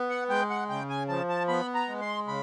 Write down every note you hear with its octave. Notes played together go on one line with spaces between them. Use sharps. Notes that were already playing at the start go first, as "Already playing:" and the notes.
Already playing: B3
F#5
G#3 G5
F#5
C#3 G5
G#5
F3 A5
A5
B3 B5
A#5
G#3
C6
C#3 B5